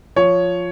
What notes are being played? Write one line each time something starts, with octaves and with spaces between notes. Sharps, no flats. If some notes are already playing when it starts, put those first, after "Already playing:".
F3 C#5